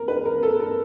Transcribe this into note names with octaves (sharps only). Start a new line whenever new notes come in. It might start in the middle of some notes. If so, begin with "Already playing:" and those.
Already playing: A#4
B4
A#4
A4
A#4